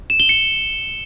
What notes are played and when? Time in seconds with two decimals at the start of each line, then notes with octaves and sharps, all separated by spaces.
0.10 E7
0.20 G7
0.29 C#7